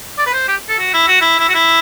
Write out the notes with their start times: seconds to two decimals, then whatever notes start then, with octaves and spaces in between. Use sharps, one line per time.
0.18 D5
0.26 B4
0.33 C5
0.48 G4
0.69 A4
0.79 F#4
0.94 E4
1.08 F#4
1.21 E4
1.39 E4
1.49 F#4
1.55 E4